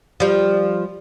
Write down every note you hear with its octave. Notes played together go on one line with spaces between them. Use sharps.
F3 G3